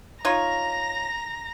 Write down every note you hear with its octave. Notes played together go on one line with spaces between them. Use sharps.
D#4 F4 C#5 A#5 A#6